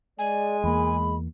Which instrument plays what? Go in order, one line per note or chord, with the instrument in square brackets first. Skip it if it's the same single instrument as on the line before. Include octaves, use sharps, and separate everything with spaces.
[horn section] G#3 [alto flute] D5 [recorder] G#5
[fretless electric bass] E2 A#3 [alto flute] B5